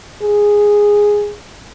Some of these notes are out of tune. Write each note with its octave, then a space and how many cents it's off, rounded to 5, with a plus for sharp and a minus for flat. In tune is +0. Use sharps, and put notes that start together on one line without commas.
G#4 -5